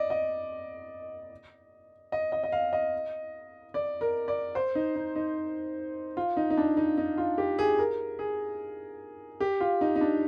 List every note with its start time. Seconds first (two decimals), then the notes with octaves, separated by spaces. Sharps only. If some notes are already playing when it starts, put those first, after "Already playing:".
Already playing: D5 D#5
0.10 D#5
2.12 D#5
2.32 D#5
2.44 D#5
2.52 F5
2.73 D#5
3.74 D5
4.01 A#4
4.28 D5
4.55 C5
4.75 D#4
4.96 D#4
5.15 D#4
6.17 F4
6.37 D#4
6.50 D#4
6.57 D4
6.77 D#4
6.98 D#4
7.18 F4
7.38 G4
7.59 G#4
7.79 A#4
8.19 G#4
9.40 G4
9.60 F4
9.81 D#4
9.96 D#4
10.01 D4